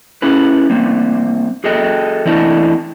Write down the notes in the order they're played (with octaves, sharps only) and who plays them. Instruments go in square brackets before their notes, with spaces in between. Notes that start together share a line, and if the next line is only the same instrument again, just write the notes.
[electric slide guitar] C#4 E4 G#4 B4
G3 A#3 C4
F#4 G#4 A4 D#5 G5
E3 A3 C4 D4 E4 D#5